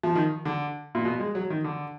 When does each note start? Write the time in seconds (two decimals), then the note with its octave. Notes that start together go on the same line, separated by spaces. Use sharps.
0.03 F3
0.15 D#3
0.45 D3
0.95 A#2
1.05 B2
1.20 G#3
1.35 F#3
1.50 D#3
1.64 D3